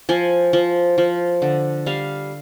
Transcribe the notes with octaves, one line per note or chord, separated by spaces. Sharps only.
F3 G#5
F3
F3
D3
G3 F5